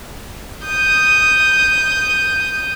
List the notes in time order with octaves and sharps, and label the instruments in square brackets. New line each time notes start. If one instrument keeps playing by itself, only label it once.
[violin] D#6 G6